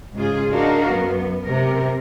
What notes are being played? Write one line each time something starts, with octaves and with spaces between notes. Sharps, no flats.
G#2 C#3 F4 G#4
D4 D#4 F#4 A#4 F5
F#2 B3
C3 A#4